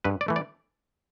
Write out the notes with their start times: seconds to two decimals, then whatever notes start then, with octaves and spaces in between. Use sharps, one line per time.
0.04 G2 B4
0.21 D5
0.28 E3 A3
0.36 D5